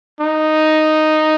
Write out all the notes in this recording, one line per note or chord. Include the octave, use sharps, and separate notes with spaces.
D#4